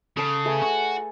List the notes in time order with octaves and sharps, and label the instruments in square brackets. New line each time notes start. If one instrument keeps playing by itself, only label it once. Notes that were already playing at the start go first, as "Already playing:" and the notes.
[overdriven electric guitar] C#3 [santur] A4 A5
[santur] A3 G#4 B4
[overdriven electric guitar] F#4